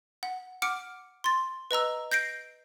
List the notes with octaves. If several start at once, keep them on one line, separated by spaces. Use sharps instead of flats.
F#5
F#5 D6 F6 C#7 D7
C6 A6
B4 D#5 A#5 E6
G6 A#6 C7 D7